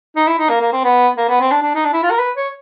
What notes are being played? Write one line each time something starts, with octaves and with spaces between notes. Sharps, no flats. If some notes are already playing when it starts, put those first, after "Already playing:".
D#4
E4
D#4
A#3
A#3
C4
B3
A#3
B3
C4
D4
D4
D#4
D4
E4
F4
A#4
B4
C#5